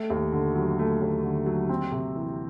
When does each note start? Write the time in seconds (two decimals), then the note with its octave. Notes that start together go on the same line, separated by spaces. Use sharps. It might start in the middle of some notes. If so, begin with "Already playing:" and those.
Already playing: A3
0.10 D#2
0.32 D3
0.55 F#3
0.79 A3
1.02 D#2
1.24 D3
1.46 F#3
1.69 C4
1.92 C3
2.16 E3